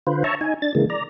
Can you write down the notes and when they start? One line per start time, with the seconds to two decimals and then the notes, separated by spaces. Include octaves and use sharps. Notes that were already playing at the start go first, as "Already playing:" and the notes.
0.07 D3 F4 B4 C5
0.24 C#5 E5 A5 A#5 C#6
0.41 D#4 G#5
0.62 D4 A6
0.75 C#3 E3 G#3 A#3
0.90 D5 A#5